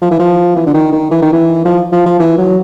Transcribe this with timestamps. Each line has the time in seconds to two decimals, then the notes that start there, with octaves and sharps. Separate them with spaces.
0.02 F3
0.11 E3
0.19 F3
0.56 E3
0.66 D3
0.74 D#3
0.92 D#3
1.11 E3
1.22 D#3
1.33 E3
1.65 F3
1.92 F3
2.06 F3
2.20 E3
2.38 F#3